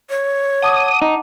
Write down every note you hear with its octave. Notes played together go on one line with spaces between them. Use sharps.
C#5
F#5 A5 D6 D#6
D#4